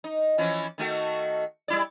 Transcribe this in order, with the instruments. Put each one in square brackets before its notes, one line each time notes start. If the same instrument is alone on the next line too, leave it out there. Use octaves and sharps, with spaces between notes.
[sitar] D#4
E3 F3 C#4
D#3 A3 F#4
G3 E4 D5